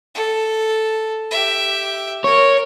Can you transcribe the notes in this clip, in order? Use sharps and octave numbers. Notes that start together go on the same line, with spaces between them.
A4
G4 E5
A#4 C#5